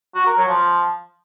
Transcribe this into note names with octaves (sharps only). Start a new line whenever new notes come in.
F#4
A#4
F#3
F3